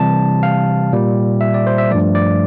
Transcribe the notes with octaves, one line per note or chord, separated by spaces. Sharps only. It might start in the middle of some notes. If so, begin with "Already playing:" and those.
Already playing: C3 E3 G3 A5
F5
A#2 G3 A#3
E5
D5
C5
E5
G2 F3 A3 D5
D5